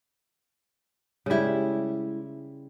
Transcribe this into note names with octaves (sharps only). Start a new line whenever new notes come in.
C#3 G3 G#3 E4